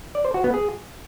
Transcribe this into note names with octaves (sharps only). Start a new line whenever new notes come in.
D5
C5
F#4
B3
G#4